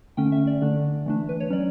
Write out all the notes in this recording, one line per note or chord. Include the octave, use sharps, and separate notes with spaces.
D3 A3 C#4 G5
E5
D5
D3 A3 D4
E3 A3 D4
B4
C#5
F#3 C#4 D5